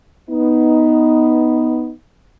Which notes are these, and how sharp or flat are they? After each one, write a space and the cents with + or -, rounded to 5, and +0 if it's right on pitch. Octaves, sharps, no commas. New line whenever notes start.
B3 +0 D#4 +10